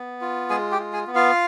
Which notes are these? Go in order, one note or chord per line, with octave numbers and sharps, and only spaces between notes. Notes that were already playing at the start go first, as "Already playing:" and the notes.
Already playing: B3
F4
G#3 G#4 G#5
G4 G5
F4
G#4 G#5
B3
F4 F5